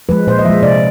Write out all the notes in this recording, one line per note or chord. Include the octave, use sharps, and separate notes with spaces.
F3 G#3 B4
A#2 C5
D#5
F3 G#3 E5
C3 D5